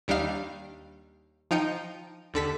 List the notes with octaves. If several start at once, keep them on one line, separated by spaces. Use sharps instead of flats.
D#2 G3 D4 D#4 F5 C7
F3 D#4 G5 C#7 D#7
D#2 D3 A4 B6